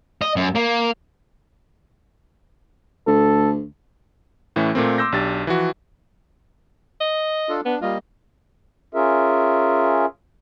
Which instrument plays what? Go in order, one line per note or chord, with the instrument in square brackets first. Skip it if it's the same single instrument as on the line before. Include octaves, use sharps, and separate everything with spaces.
[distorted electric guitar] D#5
F#2
A#3
[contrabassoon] D2 [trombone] A4
[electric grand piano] A2 E3 A3 C#4
A#2 A3 A#3 C4
C6 D6 E6 G6 A#6
B1 D4 G4 A6
E3 F3 F#4
[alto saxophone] D#5
[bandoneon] D4 F4 A4
[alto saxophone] B3 [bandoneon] D4
[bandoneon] G3 A#3 D#5 [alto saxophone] F4
[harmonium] C#4 F4 G#4 A#4 E5